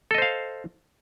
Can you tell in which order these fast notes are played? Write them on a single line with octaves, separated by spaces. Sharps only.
A4 D#5 C5 F5